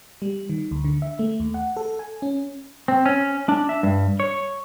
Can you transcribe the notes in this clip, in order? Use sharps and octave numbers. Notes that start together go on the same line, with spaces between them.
G3
D#3
D2
D3
E5
A3
D#2
F#5
A4
G#5
C#4
C4
C#4
D4
E5
G2
C#5